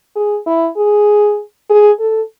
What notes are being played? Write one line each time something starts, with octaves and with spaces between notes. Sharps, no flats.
G#4
E4
G#4
G#4
A4